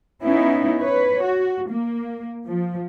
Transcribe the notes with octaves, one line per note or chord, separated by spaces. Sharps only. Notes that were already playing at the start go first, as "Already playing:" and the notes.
B3 C#4 D#4 E4
B4 C#5
F#4
A#3
F3